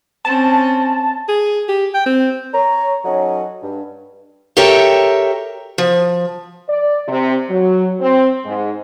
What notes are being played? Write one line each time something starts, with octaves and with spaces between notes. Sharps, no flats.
C4 C#4 A5
G#4
G4
G5
C4
C#5 A#5
F#3 C#4 D#4 A4 D#5 F#5
G2
G4 A4 A#4 C#5 E5 G5
F3
D5
C3
F#3
C4
G#2